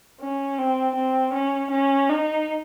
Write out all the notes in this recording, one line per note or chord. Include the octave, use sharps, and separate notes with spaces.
C#4
C4
C4
C#4
C#4
D#4